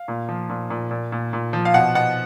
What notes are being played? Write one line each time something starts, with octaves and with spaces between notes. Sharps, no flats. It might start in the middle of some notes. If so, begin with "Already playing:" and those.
Already playing: F5
A#2
F3
A#2
A#2
A#2
A#2
A#2
F3
F5
B2 F#5
B2 F#5